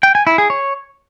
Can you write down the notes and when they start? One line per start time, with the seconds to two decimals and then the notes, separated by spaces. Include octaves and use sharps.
0.03 G5
0.15 G#5
0.27 E4
0.38 G#4
0.50 C#5